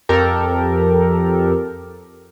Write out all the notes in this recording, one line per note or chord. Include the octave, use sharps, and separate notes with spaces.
F2 G4 A4 A#4